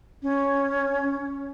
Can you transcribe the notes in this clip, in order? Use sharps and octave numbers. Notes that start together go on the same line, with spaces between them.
C#4